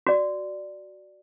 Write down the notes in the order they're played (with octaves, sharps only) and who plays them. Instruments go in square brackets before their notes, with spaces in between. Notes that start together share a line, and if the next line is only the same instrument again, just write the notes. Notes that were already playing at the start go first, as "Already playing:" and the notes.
[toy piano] F#4 D5